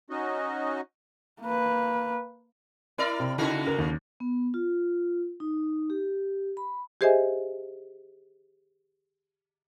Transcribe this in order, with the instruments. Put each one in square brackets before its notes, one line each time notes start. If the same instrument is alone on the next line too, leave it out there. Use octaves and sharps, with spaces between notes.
[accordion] C#4 D#4 F#4 D#5
[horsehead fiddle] A#3 B4
[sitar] E4 A#4 D5
[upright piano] C3
[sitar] C#3 A#3 F#4 [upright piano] D#4 E4
[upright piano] A#4
D#2
[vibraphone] B3
F4
D#4
G4
B5
[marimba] G4 G#4 C5 D#5 E5 G#5